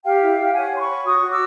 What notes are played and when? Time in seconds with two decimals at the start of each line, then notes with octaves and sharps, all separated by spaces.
0.04 G4 F5 G5
0.21 E4
0.38 G4
0.55 C#5 F#5 G#5
0.71 C#5 C6
0.79 B5 C#6
0.88 C#5
1.04 F#4 C#6 D#6
1.21 F#4
1.30 D6 E6